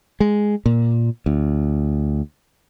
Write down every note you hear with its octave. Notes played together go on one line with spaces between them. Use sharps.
G#3
A#2
D2